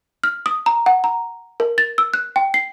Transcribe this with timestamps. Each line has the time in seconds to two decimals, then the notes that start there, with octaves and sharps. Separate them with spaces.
0.24 F6
0.46 D#6
0.66 A#5
0.86 F#5
1.04 A#5
1.60 A#4
1.78 A6
1.98 E6
2.14 F#6
2.36 G5
2.54 C7